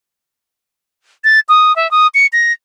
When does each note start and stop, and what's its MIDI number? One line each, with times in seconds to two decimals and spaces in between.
1.24 1.40 93
1.49 1.75 87
1.76 1.90 76
1.91 2.07 87
2.14 2.27 97
2.33 2.52 94